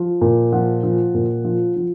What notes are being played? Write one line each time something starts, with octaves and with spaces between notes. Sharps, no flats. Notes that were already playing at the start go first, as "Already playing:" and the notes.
Already playing: F3
A#2
F3 F#5
F3
A#2
F3
F3